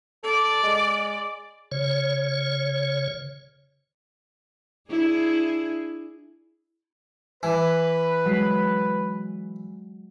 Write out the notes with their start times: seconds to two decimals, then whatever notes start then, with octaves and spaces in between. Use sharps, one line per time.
0.24 A4 D5
0.63 G#3
1.72 C#3 C#5
4.89 D4 E4 G#4
7.43 E3 B4 D6 G#6
8.25 F#3 G#3 C7